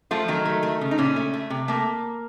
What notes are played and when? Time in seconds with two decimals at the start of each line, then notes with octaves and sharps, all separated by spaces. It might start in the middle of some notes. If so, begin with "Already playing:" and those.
0.11 F3 A3 F4
0.28 D#3 F#3 D#4
0.45 A3
0.63 A3
0.81 C#3
0.91 D#4
0.98 A#2 C#3 C#4
1.16 A3
1.33 A3
1.50 C3
1.68 A3 A#3